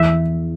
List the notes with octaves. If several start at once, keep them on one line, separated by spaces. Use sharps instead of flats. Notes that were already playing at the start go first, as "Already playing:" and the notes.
Already playing: E2 E5